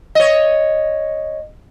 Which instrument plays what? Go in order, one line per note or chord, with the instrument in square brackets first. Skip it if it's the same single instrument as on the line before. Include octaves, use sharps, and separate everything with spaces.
[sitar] C#5 D#5